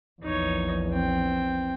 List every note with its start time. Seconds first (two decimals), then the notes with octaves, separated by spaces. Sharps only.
0.22 A#1 E2 D#4 C#5
0.91 C4 G5